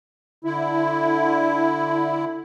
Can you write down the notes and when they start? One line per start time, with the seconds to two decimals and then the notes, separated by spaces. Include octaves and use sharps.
0.45 D3 E4